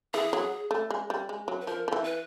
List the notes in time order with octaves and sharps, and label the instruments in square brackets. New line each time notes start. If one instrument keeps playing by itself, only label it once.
[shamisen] E3 [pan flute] G#4
[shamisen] F#3
A3
G#3
G3
G#3
F#3
[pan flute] B4
[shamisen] F3 [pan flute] A#4
[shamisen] F3
E3
[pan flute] B4